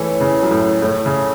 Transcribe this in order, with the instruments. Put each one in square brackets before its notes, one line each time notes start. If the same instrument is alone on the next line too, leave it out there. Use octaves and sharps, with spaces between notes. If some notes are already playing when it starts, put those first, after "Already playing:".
Already playing: [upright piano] E3 [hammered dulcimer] A3 E4 C#5
[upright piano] C#3
F#2
A2
[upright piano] A2 [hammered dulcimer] A3 E4 C#5
[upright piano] C#3